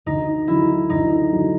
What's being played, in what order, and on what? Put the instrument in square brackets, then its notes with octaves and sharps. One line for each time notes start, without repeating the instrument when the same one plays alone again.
[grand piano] D2 [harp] D#4
[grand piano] D3 F#3 [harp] E4
[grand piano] D2 [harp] D#4
[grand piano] D3 F#3